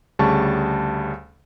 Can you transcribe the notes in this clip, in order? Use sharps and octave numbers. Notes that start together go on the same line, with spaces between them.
D2 C#3 G3 A5 C#6